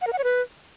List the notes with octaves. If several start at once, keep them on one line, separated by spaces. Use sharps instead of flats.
F#5
A#4
F#5
C#5
B4